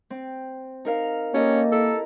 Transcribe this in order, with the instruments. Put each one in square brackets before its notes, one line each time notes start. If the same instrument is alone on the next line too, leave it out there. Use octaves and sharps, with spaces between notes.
[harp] C4
D#4 A#4 F5
[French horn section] A#3 [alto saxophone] C#4 [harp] G4 A4 D#5
[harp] E4 A#4 [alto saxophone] A4